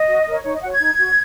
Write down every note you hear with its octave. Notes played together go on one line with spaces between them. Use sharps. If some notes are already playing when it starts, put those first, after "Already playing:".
Already playing: D#5
F#4
A#4 C#5
D#4 C#5
D#5
F#4 C#5 F#5
G#6
D#4
F#4 C#5